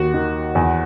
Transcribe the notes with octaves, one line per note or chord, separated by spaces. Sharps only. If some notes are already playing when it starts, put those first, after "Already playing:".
Already playing: D#2 F#4
D#3
E2